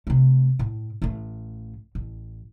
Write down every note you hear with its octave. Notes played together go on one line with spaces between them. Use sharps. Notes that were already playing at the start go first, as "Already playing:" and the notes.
C3 A3
A2
A1 A3
A1